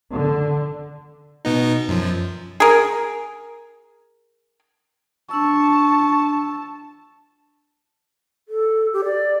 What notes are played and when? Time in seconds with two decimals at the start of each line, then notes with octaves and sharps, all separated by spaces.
0.10 D3
1.45 B2 B3 D#4
1.89 F#2 F3
2.60 G#4 A#4
5.31 D4 A5 C#6 E6
8.49 A4
8.93 G4
9.05 D5